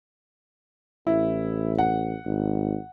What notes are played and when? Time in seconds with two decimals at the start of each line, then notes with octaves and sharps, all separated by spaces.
1.07 A1 E4
1.78 F#5
2.25 G#1